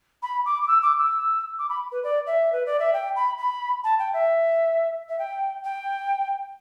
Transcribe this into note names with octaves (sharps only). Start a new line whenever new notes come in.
B5
D6
D6
E6
D6
E6
D6
B5
B4
D5
E5
B4
D5
E5
G5
B5
B5
A5
G5
E5
E5
G5
G5